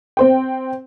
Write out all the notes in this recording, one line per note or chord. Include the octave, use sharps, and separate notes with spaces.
C4 C5 G5